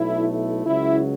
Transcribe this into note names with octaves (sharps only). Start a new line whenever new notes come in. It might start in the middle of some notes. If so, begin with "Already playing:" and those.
Already playing: B1 B2 A3 E4
E4
C#2 C#3 F#3 E4